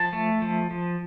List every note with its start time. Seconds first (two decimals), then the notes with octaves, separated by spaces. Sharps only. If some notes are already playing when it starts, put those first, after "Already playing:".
Already playing: F3 A5
0.13 A3
0.42 F3
0.71 F3